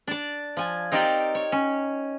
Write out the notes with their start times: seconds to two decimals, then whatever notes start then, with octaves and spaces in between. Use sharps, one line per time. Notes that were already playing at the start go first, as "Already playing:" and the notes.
0.07 D4 D5
0.57 F3 G#5
0.92 C4 D#4 G4 A#4 D5
1.35 C#5
1.52 C#4